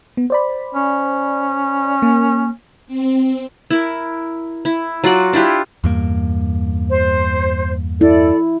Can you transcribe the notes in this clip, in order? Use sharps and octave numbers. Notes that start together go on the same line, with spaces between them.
B3
C5 D5 B5
C#4
A#3
C4
E4 A#4
E4
F#3 F4 F#4 D5
D4 E4 F4 G4
E2 G2 A#3
C5
E4 A4 D5